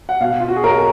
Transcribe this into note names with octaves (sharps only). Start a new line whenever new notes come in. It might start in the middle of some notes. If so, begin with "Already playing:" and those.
F#5
B2 F5
F4
F#4
G#4
B1 A#4